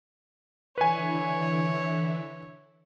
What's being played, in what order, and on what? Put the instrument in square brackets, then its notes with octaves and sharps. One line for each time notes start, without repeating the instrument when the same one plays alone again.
[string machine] D3 E3 E4 [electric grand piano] B4 G#5 [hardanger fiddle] C#5